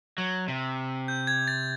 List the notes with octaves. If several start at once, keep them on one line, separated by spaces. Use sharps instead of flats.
F#3
C3
G6
G#6
A6